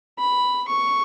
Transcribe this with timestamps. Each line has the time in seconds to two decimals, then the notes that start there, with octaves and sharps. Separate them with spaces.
0.19 B5
0.68 C#6